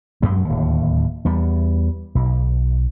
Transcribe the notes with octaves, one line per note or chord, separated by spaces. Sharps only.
F#2 F#3 G#3
D1 D#2
E2 G3
B1